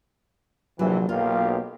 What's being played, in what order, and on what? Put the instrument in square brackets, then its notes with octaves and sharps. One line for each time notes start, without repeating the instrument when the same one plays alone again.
[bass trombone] A#1 [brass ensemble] C3 E3 [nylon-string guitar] F#3
[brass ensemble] B1 G4 F5 [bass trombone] A#3 [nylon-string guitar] F4